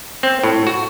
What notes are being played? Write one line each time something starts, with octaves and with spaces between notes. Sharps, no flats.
C4
A2
F#4